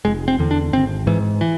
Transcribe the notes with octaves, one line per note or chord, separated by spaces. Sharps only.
F1 G#3
C4
E2 D3
D4
G#1 C4
G#2 E3
E3